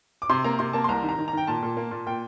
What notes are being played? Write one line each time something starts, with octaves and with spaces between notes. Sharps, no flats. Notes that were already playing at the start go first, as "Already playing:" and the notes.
D6
C3 C6
A#3 A#5
C3 C6
A#3 A5
C6
C2 A#5
D#3
A#5
D#3
A#5
D#3 G5
A#2 A5
A#2
A#3
A#2
A#2 G5